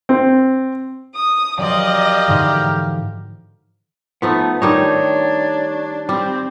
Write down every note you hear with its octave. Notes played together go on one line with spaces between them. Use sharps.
C4
D#6
F3 F#3 G4 A#4 D5 D#5 F5
G#2 D3 E3
F3 A3 B3 D#4
D#3 G3 D4 D#4 C#5
G3 C4